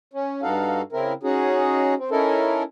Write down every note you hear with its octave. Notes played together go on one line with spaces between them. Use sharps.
C#4
G2 D#4 F#4 A4 F5
C#3 C4 E4 A#4
C#4 D#4 F#4 G#4
C4
C#4 D#4 E4 A4 A#4